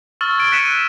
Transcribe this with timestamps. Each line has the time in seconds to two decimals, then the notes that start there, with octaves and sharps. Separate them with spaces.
0.21 C#6 E6 F6 A6 F#7
0.38 G#6 D7
0.52 F#6 B6 C#7 D#7 E7
0.65 D#7 E7